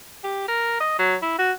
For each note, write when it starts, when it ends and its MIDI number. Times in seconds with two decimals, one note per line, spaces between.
0.24 0.45 67
0.48 0.79 70
0.81 0.95 75
0.99 1.16 54
1.22 1.35 64
1.39 1.52 66